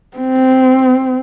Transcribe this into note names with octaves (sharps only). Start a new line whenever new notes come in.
C4